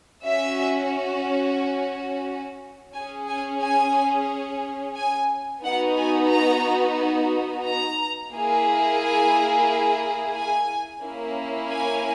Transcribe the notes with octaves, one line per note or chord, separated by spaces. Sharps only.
C#4 F#4 E5
C#4 G#4 G#5
G#5
G#5
G#5
B3 D#4 F#4 F#5
G#5
A#5
A#5
A#3 E4 G#4
G#5
G#5
A#3 C#4 E4
G#5